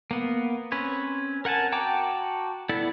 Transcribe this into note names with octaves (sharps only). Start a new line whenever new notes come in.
A#3 B3
C4 C#4 B4 C#5
A#4 F#5 G#5 A5
F#4 G5 A5 A#5 D6
B3 E4 A4 D5